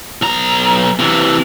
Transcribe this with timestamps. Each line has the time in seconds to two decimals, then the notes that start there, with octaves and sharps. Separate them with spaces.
0.22 B1 A#5
0.99 C3 E3